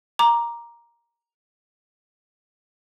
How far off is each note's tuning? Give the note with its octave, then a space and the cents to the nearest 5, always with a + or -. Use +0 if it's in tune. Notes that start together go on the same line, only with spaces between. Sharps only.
A#5 +10 D6 +5